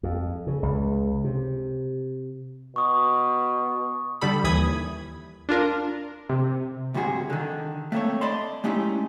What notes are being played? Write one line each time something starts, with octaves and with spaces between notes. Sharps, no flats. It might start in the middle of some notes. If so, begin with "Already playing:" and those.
F2
C#3
C#2
C3
B2 C#6 D#6
D3 G3 A4 B5
D#2 E3 B5 D#6 G#6
D4 F4 A#4
C3
D2 G2 C3 F#4 G#4
D3 D#3
A3 A#3 C4 A4 C#5
D5 D#5 A5 B5 C6
G#3 A3 C#4 D#4 E4 G4